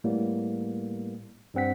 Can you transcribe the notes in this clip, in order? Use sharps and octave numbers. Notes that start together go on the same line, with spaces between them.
A2 G3 A#3 B3
G2 G3 C4 F#5 B6